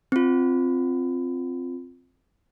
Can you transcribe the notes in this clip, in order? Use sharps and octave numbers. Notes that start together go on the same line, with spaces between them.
C4 F4